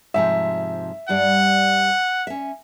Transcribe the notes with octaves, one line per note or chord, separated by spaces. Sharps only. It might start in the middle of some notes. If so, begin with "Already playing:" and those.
G#2 C3 F3 E5
G2 G3 D5 F#5
C#4 E5